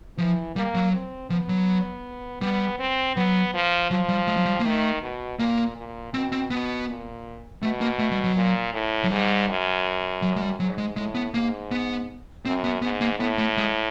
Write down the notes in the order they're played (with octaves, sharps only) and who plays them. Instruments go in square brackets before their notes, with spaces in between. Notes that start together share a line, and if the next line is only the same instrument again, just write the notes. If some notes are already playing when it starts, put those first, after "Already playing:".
[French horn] E3 [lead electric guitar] F3
[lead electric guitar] G3 [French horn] A#3
[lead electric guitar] F#3
[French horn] C4
[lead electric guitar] F3 [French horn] B3
[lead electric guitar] F#3
[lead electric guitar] G3 [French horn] B3
[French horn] C4
[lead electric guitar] F#3 [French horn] B3
[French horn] F3
[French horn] F3 [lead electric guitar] F#3
[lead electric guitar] G3
G#3
F#3
G3
A#3
[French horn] D#3 [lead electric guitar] A3
[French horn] B2
[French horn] A#2 [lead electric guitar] A#3
[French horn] A#2
[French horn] B2 [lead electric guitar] C4
[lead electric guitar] C4
[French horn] B2 [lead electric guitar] B3
[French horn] A#2
[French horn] B2 [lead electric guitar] A3
[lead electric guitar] A#3
A3
G3
F#3
[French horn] A#2
A2
[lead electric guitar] F#3
[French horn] G#2 [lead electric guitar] G3
[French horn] F#2
[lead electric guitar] F#3
G#3
G3
[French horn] G#2 [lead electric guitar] F#3
[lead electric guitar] G#3
[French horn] A2 [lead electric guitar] G#3
[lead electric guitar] B3
[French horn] G#2 [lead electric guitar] A#3
[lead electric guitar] B3
[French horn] F#2 [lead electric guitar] C4
[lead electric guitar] B3
[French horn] G#2 [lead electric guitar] B3
[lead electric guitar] A#3
[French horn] A2 [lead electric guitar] B3
[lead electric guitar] A3
G#3